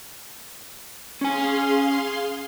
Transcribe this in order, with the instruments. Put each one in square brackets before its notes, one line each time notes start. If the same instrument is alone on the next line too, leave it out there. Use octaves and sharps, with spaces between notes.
[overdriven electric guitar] C#4 G#5 [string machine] G#4 F5 C6